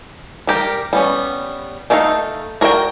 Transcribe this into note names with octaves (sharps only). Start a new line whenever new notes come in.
G3 G4 A#4
G3 B3 C#4
A3 D4 D#4 A4 F5
F#4 A#4 D5 E5 G5